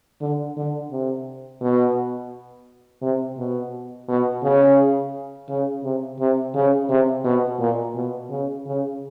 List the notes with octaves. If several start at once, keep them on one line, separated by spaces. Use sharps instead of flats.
D3
D3
C3
B2
C3
B2
B2
C#3
C#3
C3
C3
C#3
C3
B2
A#2
B2
C#3
C#3